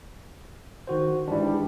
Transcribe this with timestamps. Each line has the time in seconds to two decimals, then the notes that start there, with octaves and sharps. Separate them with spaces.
0.87 D#3 F#4 C5
1.28 G#2 E3 G3 D4 E4